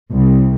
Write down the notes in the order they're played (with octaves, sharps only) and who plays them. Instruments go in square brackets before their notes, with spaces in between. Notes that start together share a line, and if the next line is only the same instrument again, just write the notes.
[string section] C2